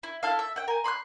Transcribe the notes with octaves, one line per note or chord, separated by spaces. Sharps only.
E4
E4 A4 F5
E5
F#5 G5
A#4 G#5
B5 C6 D#6 F#6